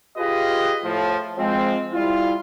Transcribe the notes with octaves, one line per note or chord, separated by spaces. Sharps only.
F4 G4 G#4 B4 D#5
A2 F3
F3 G#3 C4
G3 E4 F4